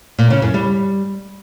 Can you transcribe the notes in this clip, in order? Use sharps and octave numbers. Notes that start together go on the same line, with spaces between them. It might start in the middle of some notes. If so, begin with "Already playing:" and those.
A#2
C#3
F#2
G3